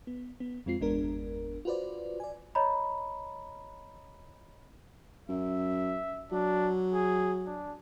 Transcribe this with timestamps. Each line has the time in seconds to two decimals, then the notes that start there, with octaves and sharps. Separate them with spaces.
0.07 B3
0.40 B3
0.66 F2 G#3 C4 F4 C7
0.81 G1 E2 G#3 B3 D4 A#4
1.65 F4 F#4 B4 C5 D5
2.20 D5 G#5
2.55 C#5 D#5 A#5 B5
5.29 F#2 E5
6.32 F#3 D4
6.94 G#4
7.46 D4